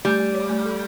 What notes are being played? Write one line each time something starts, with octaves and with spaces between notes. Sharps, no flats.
G3 A3
A3
C#5
A3
A4